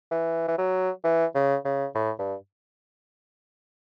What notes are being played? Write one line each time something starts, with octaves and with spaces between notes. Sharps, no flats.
E3
E3
F#3
E3
C#3
C#3
A2
G2